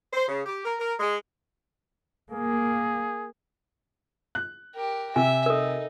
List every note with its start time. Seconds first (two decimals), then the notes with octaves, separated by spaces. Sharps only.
0.13 C5
0.29 C#3
0.46 G4
0.65 A#4
0.80 A#4
1.00 G#3
2.31 A#3 G#4
4.35 F#6
4.74 G4 A#4
5.16 C3 E5 G#5
5.46 D#4 A4 A#4